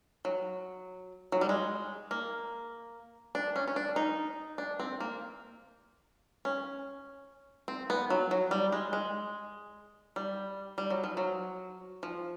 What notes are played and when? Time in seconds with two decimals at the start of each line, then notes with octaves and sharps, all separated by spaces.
0.25 F#3
1.32 F#3
1.41 G3
1.49 G#3
2.11 A#3
3.35 D4
3.56 C#4
3.68 C#4
3.76 D4
3.96 D#4
4.58 D4
4.80 C4
5.00 A#3
6.45 C#4
7.68 C4
7.90 B3
8.10 F#3
8.31 F#3
8.51 G3
8.72 G#3
8.93 G#3
10.16 G3
10.78 G3
10.90 F#3
11.04 F3
11.17 F#3
12.03 F3